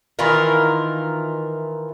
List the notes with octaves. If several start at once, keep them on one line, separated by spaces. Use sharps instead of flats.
D#3 E3 F4 A#4